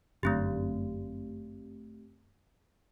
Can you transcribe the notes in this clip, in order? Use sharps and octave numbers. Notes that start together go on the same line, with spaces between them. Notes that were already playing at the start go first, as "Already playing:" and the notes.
G1 F#2 D3 A3 C4 G4